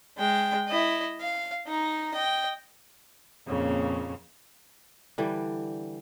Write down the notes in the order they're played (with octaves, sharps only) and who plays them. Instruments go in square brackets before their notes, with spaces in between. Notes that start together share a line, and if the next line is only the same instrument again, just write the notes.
[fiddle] G#3 G5
E4 D#5
F5
D#4 A#5
D#5 G5
[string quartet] F2 A#2 C#3 A#3 C#5
[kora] D3 E3 G3